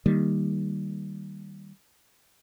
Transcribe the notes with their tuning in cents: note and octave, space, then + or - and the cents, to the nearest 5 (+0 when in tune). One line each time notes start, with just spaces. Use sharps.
D#3 +0 G3 +0 A#3 -10